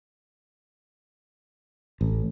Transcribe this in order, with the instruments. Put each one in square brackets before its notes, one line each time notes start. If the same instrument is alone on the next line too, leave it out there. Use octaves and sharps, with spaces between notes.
[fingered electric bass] A1